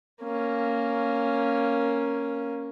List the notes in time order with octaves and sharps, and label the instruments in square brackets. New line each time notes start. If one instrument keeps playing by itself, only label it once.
[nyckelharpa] A#3 C#4